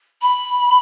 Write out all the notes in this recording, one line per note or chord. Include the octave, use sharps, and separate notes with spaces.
B5